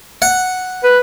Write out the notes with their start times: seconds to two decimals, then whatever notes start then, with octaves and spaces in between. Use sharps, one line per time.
0.22 F#5
0.84 B4